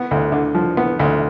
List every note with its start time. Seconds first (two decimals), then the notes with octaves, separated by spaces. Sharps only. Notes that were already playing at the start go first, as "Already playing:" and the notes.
Already playing: B3
0.11 D2
0.32 D3
0.55 F3
0.77 B3
0.99 D2